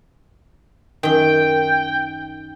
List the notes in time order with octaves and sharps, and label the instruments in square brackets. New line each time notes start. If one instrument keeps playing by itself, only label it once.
[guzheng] F#2 D#3 [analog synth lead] G5